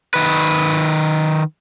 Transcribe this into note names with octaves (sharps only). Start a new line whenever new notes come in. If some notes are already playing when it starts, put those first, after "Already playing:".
D#3 B4